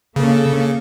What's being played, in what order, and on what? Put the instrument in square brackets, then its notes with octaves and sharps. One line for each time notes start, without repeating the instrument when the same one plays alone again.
[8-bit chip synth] C#3 [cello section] A#3 A4